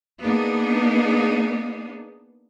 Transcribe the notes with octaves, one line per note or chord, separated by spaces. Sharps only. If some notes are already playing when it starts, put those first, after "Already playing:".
A#3 B3 D4 D#4 G#4